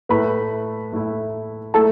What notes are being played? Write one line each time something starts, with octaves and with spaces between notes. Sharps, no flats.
A2 A3 E4 B4 B5
A2 A3 E4
A3 E4 A4 A5